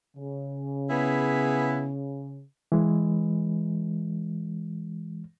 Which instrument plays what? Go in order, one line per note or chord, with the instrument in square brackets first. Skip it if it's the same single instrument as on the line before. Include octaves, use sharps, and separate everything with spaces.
[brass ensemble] C#3
[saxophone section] B3 E4 G#4
[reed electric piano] E3 G#3